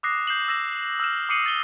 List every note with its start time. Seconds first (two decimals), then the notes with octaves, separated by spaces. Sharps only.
0.03 D6 D#6 F#6 A#6 C7
0.27 G6 C7 E7 F#7
0.48 E6 A#6 E7
1.00 E6 F6 E7
1.29 D6 D#6 C7 C#7 D#7 F#7
1.46 A6 G7